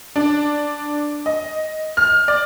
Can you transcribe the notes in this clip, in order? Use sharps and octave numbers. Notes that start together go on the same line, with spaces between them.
D4
D#5
F6
D5